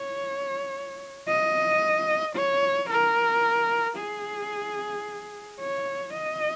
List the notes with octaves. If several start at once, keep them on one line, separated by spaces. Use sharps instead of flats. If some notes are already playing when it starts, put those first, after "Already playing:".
Already playing: C#5
D#5
C#5
A#4
G#4
C#5
D#5